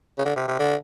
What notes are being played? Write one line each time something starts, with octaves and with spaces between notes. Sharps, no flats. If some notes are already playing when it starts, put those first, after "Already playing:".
C#3
D3
C3
C3
D3